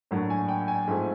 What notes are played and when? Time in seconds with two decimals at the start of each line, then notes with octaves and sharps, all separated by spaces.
0.11 A2 F#3 A#3 D4
0.30 G#5
0.49 G5
0.68 G#5
0.87 G#2 F3 A3 C4